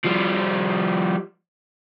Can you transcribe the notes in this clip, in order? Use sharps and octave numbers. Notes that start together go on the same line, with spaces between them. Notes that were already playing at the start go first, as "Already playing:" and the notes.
F3 G3